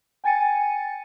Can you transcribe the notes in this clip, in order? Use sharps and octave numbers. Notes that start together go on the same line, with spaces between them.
G5 G#5 A6 C#7 D#7